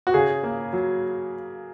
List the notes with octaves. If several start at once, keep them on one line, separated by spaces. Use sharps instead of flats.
F#4
C#3 G#4
A#3
F#3